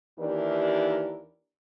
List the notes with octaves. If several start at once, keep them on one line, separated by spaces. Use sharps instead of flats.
D#2 E3 D4 E4 G4 A#4